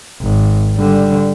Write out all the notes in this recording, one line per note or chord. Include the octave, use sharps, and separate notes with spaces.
G#1
D3 G3